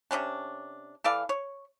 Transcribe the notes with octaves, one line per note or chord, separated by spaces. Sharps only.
C3 F3 C#4 D4
E3 A4 D5 F5
C#5